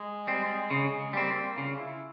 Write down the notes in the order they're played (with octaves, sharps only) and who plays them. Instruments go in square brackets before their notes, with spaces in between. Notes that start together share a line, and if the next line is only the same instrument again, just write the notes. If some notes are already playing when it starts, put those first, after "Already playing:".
Already playing: [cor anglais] G#3
[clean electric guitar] G3 C4
[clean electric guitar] C#3 [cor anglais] G#3
[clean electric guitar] G3 C4 [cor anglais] A#3
[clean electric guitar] C#3 [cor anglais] F4
[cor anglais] E4